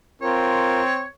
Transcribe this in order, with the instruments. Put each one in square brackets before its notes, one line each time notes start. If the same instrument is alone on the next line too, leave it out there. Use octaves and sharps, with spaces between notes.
[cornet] C4 [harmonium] F4 A#4 [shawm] C#5